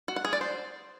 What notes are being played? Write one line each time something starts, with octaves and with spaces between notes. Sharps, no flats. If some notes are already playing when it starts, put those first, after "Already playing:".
F#4
F#5
G#4
D5
C5